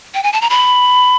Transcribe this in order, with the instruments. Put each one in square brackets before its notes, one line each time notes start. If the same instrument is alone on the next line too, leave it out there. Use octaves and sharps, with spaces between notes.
[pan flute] G5
G#5
A5
A#5
B5